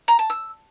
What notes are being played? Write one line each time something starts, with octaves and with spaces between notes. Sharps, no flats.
A#5
A5
E6